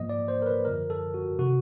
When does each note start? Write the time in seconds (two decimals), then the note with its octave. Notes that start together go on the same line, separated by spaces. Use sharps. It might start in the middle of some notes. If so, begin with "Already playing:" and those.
Already playing: G#2 F3 A#3 D#5
0.09 D5
0.28 C5
0.42 A#4
0.46 B4
0.65 F#2 D3 F3 A#4
0.90 A4
1.14 F#4
1.39 C3 D#3 F#4